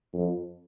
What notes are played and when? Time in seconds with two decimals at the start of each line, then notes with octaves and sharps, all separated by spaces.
0.14 F2